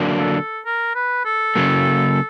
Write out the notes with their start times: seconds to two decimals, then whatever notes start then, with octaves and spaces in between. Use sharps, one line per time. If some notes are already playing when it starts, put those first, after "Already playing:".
Already playing: D3 F#3 A#3 D4
0.19 A4
0.65 A#4
0.95 B4
1.25 A4
1.56 C#3 F#3 A#3